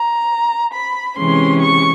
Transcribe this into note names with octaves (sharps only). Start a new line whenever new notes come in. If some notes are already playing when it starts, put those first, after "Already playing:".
Already playing: A#5
B5
C3 E3 G#3 C#4 C6
C#6